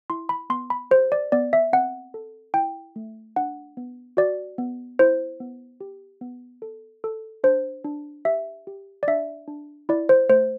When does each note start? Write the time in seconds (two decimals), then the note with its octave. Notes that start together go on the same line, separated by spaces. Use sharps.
0.10 E4 C6
0.29 B5
0.50 B3 C6
0.70 B5
0.91 G4 C5
1.12 D5
1.32 B3 D5
1.53 E5
1.73 C4 F#5
2.14 A4
2.54 E4 G5
2.96 A3
3.36 D4 F#5
3.77 B3
4.17 F#4 D5
4.58 B3
4.99 E4 C5
5.40 B3
5.81 G4
6.21 B3
6.62 A4
7.04 A4
7.44 D4 C5
7.84 D4
8.25 G4 E5
8.67 G4
9.03 D5
9.07 D4 E5
9.48 D4
9.89 E4 D5
10.09 C5
10.29 A3 C5